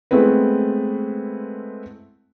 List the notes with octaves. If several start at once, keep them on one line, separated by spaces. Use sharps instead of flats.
G#3 A3 B3 C4 E4 B4